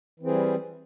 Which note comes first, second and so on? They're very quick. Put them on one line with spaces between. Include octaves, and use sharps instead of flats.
E3 C4 G#4 G3